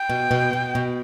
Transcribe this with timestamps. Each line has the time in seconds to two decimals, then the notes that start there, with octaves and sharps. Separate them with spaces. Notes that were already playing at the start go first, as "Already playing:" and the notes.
Already playing: G5
0.10 B2
0.31 B2
0.53 B2
0.75 B2